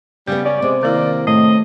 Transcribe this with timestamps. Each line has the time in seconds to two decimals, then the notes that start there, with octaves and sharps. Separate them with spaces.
0.27 C#3 G3 B3 G4
0.45 C#4 D5
0.62 C3 G#3
0.83 D#3 A#3 E4 D5
1.27 A2 A3 D#5